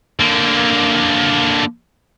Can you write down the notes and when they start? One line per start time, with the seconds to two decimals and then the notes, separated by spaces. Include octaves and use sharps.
0.19 D3 A#3